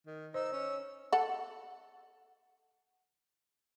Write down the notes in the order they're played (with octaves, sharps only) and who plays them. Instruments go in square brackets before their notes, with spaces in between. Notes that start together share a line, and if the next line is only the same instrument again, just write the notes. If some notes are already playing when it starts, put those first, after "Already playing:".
[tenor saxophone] D#3
[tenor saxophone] D#4 [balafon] C5 [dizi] E6
[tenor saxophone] C#4
[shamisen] A4 F#5